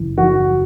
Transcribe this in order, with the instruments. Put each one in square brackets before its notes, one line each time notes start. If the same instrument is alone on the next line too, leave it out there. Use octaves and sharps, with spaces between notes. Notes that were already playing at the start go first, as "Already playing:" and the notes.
Already playing: [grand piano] F#1 E3
E3 F#4